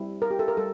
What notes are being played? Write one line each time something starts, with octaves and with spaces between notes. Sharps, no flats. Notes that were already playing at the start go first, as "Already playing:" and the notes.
Already playing: G3 C4 E4 G4
A#4
G4
A4
A#4
G3 A4